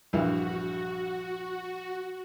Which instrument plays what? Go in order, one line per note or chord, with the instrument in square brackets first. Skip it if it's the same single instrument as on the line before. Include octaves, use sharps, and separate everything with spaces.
[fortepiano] A#1 G2 E3 [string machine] F#4